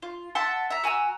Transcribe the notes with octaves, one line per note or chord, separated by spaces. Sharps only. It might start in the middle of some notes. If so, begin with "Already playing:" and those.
F4
E5 F#5 A5 C6
E5 A#5
F#4 G#5 A#5 E6